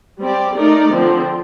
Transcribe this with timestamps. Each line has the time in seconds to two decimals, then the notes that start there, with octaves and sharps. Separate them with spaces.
0.21 G3 C4 G4 D5
0.57 A3 D#4 A#4 D5
0.92 D3 F3 C4